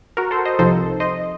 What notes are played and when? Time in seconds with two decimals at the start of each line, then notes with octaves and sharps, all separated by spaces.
0.17 F#4 A#4
0.31 A4 C5
0.45 C5 D#5
0.59 C2 C3 F3 C4 D#4 A4 C5
1.00 C5 D#5